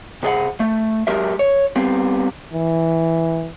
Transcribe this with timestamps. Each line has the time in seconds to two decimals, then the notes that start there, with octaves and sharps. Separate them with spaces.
0.23 C3 G#4 D5 F#5
0.60 A3
1.07 F#3 G#3 G4 A#4 E5
1.39 C#5
1.76 G3 B3 C4
2.53 E3